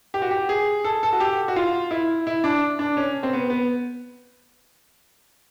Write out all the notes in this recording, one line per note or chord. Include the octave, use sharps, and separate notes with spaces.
G4
F#4
G4
G#4
A4
A4
F#4
G4
F#4
F4
E4
E4
D4
D4
C#4
C4
B3
B3